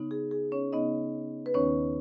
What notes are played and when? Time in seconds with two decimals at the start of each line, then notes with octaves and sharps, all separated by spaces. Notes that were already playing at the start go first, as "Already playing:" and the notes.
Already playing: C#3 B3 D#4
0.11 G#4
0.31 G#4
0.52 C#4 C#5
0.73 C#3 B3 D#4 D#5
1.46 B4
1.54 D#2 D#3 B3 C#4 D#4 C#5